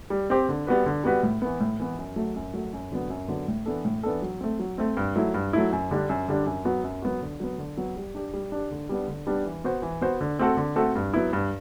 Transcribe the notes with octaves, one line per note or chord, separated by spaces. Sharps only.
G3
C4 G4 C5
D3
G3 B3 F#4 B4
D3
G3 B3 F#4 B4
A2
E3 B3
A2
E3 B3
F#2
F#3 A3
F#2
F#3 A3
F#2
D3 F#3 B3
F#2
D3 F#3 B3
A2
E3 B3 D4 A4
A2
E3 B3 D4 A4
F#3
A3 C4
F#3
A3 C4
G2
F#3 A3 E4
G2
F#3 A3 E4
F#2
D3 G3 D4
F#2
D3 G3 D4
F#2
F#3 B3 F#4
F#2
F#3 B3 F#4
D3
F#3 B3
D3
F#3 B3
G3
D4 G4
G3
D4 G4
D3
G3 B3 D4
D3
G3 B3 D4
E3
B3 F#4 C5
E3
B3 F#4 C5
D3
A3 C4 F#4 A4
D3
A3 C4 F#4 A4
G2
F#3 B3 E4
G2